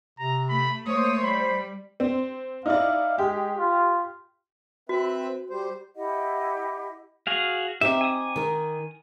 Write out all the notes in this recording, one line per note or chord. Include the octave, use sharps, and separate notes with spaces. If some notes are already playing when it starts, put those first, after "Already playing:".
C3 A#5
A3 B5
A3 A#3 C5 C#5 D#6
G3 B5
C4
D#4 E4 D5 F5
G#3 G4
F4
C4 F#4 B4 E5
G3 C5
E4 G4 D#5 F#5
F#4 G#4 F5
C4 D#4 G4 E5
G#5 D#6
D#3 A#4